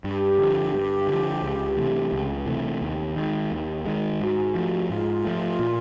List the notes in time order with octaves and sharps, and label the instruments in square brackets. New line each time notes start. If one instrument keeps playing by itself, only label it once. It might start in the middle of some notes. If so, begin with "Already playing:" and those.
[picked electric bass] G2 [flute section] G4
[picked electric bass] D3 F3
G2
D3 F3
C#2
C3 E3 A3
C#2
C3 E3 A3
D#2
D#3 G#3
D#2
D#3 G#3
[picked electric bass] G#2 [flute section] F#4
[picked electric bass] F3 A3
[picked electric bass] G#2 [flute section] F4
[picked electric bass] F3 A3
A#2